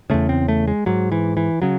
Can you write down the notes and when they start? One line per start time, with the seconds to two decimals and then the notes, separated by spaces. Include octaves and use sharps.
0.10 E2 C#3 A3
0.29 C4
0.48 A3
0.68 G#3
0.86 G#2 F#3
1.12 E3
1.37 E3
1.62 C#3 F#3